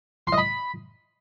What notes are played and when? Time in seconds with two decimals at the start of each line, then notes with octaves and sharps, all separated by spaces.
0.27 C6
0.33 D#5
0.38 B5